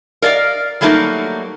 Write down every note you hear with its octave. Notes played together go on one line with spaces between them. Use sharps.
A#4 D5 D#5 F5
F#3 G3 A3 A#3 D#4 F#4